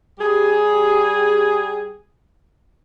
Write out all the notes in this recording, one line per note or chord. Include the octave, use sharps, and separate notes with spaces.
G3 G4 G#4